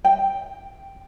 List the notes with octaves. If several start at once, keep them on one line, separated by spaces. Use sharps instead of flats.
G5